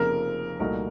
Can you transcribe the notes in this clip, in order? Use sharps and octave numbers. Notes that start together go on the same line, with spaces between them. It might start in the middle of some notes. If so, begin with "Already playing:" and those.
Already playing: F1 F2 C#3 F3 A#3 A#4
C2 A#2 A3 D#4 F#4 A#4